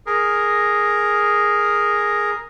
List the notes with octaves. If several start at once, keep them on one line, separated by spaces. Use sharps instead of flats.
G#4 A#4